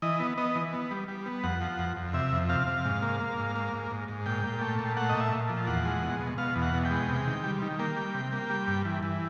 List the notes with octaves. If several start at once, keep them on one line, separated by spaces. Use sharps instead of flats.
E3 D#5
B3
B3 D#5
E3
B3
G3
G3
B3
F2 F#5
F3
F2
F2
C3 E5
F2
C3 F5
C3
G#2
A#3
A#3
G#2
A#3
G#2
G#2
G#2
A#2 G5
A#2
A3
A#2
A3 F#5
D#5
A#2
E5
A#2
F3
E2 F#5
G#3
B2
B2
B2 F5
E2
F#5
B2
G5
G#3
C3
D#3
G3
D#3
A#3 G5
G3
C3
A#3
G3
G2
E3
E3